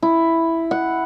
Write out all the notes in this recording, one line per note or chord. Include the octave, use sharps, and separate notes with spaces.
E4
F#5